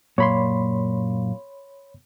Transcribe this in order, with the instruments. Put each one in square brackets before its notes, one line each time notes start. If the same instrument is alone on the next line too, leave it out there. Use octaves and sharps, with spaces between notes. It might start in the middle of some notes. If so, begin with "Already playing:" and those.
[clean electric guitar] F#2 A#2 [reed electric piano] C#5 B5 C6